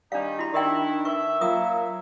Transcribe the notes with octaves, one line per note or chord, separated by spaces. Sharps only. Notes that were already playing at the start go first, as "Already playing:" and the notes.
D#3 G3 D4 D#4 F5
E4 F#4 B5
D#3 D4 E4 G4 E5 G5
B4 E5 C#6
F#3 A#3 F4 A#4 D#6